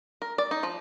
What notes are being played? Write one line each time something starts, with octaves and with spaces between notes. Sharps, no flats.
A#4
D5
D#4
F3